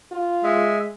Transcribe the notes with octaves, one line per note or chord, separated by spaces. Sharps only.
F4
G#3 E5